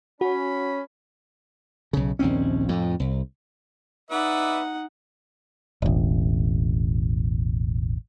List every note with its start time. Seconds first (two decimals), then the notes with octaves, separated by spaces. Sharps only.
0.21 C#4 F#4 B5
1.93 B1 C#3
2.19 A#1 D#2 C4 C#4
2.69 F2 A2
3.00 C2
4.10 D#4 B4 D5 E5 F#5
5.82 E1 A1